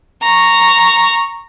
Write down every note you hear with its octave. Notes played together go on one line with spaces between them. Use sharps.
A#5 C#6